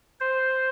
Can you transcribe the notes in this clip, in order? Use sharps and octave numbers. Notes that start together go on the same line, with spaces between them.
C5